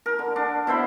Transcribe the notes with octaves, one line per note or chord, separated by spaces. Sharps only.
A#4
D3
D4
B2 E4 C5 B5